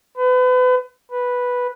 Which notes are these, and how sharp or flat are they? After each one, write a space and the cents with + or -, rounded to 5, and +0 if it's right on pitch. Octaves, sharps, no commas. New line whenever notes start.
B4 +35
B4 -5